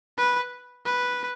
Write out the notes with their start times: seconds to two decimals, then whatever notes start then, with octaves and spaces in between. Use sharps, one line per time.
0.18 B4
0.85 B4